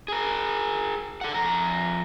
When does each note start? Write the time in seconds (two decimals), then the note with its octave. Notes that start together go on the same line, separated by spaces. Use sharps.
0.08 G#4 A#4
1.21 A4 F#5
1.34 F2 A#5